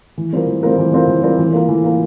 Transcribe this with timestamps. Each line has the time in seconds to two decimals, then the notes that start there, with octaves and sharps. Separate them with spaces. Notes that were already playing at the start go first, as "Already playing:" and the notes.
0.18 E3
0.33 G3 C4 F4 A#4
0.47 E3
0.63 G3 C4 F4 A#4
0.78 E3
0.92 G3 C4 F4 A#4
1.08 E3
1.23 G3 C4 F4 A#4
1.39 E3
1.53 A#3 F4 A#4
1.69 E3
1.84 A#3 F4 A#4